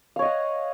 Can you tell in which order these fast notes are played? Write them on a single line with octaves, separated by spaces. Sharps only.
F5 C#5 D#5 F#5